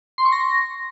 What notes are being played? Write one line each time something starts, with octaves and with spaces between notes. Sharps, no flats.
C6
C#6
A#6